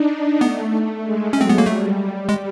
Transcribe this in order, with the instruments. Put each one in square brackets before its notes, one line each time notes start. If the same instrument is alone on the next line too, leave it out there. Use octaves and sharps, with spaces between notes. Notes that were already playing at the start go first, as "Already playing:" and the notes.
Already playing: [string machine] D4 D#4
[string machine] A3 [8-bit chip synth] B3
[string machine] G#3
[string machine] F#3 [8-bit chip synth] C#4
[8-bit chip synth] C4
B3
A#3
[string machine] G3 [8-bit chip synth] A3
[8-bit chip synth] G#3